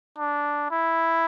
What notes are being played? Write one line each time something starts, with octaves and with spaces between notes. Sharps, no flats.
D4
E4